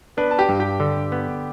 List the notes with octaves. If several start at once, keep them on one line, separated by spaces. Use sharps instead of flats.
B3 D4 B4
A5
G4 G5
G2
G4 G5
D3
B3